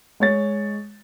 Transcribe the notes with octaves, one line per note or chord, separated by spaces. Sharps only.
G#3 C#5 A6